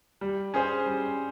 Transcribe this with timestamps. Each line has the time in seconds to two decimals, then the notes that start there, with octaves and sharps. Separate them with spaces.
0.21 G3
0.54 C#4 G#4 C5
0.86 G3